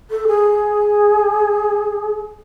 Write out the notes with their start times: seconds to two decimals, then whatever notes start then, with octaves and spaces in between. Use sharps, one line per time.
0.11 A4
0.28 G#4